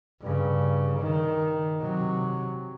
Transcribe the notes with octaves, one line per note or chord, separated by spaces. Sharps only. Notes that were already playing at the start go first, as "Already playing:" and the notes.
G2 C#3
D#3
C3 F#3